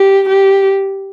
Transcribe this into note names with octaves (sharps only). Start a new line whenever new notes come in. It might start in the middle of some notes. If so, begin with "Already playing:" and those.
Already playing: G4
G4